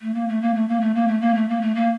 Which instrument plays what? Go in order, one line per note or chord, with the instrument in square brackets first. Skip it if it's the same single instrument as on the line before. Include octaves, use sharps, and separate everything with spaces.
[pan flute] A3
A#3
A3
A#3
A3
A#3
A3
A#3
A3
A#3
A3
A#3
A3
A#3